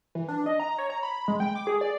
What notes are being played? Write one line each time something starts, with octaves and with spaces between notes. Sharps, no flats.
E3
D4
D#5
A#5
C#5
A#5
B5
G#3
G5
D6
G#4
D5